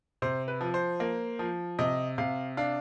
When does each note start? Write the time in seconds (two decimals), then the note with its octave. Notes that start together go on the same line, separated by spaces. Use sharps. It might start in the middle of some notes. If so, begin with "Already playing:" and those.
0.22 C3 C5
0.48 B4
0.61 F3
0.74 C5
1.00 A#3
1.39 F3
1.79 C3 D#5
2.18 C3 F5
2.57 D4 F5